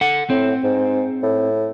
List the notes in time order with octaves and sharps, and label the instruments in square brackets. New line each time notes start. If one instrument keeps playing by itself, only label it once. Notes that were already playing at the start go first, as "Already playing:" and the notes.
[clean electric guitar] A4 F#5
[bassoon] A2 [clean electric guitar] C4
[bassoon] G#2
A2